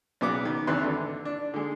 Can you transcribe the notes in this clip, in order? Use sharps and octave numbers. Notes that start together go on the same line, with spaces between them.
B1 C#3 B3 B4 D6
D#3
G#1 E2 C3 D4 B4 C6
D3
D4
D3 G#3